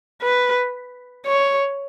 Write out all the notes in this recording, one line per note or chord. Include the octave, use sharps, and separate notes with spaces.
B4
C#5